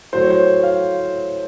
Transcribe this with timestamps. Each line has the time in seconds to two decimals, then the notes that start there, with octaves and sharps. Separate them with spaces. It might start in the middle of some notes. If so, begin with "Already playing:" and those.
0.13 A2 F#3 C5
0.22 C#5
0.30 C5
0.63 F5